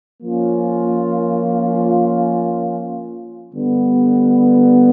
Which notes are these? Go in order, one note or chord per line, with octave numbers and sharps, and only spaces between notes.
F3 A#3 C#4 F4
D3 G3 B3